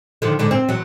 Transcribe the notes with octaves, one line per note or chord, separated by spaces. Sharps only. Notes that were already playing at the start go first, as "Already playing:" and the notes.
D3 D#3 F3
G#2 D3 D4
C4
E2 F#3